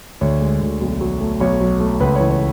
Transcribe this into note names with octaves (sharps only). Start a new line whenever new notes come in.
D2 C#5
G#3
D2
B1
F#3
A3
B1 C#5
F#3
A3
C#2 B4
E3 C#5
C#5